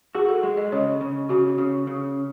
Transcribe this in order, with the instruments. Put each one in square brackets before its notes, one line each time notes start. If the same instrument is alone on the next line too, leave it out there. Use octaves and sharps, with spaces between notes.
[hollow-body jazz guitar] F#4 [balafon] G#4
[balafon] A4
[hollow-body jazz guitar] G#3
[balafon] D#5
[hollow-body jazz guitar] C#3 [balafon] C#5
[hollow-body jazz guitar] C#3
[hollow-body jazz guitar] C#3 [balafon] F#4
[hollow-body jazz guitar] C#3
C#3